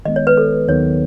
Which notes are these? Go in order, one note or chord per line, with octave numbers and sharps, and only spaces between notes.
D#3 G#3 B3 D#5
C#5
B4
A4
D#2 D#3 F#3 B3 C#5